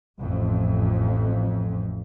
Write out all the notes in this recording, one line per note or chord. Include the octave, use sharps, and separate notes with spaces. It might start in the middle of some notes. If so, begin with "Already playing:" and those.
A1 F2